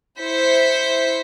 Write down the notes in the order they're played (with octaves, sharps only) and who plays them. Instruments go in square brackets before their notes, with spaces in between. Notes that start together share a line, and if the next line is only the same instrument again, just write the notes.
[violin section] E4 C5 B6 C#7